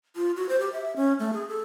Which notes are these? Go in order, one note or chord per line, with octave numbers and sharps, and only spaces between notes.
F4
F#4
C5
G4
E5
C#4
A3
G#4
A4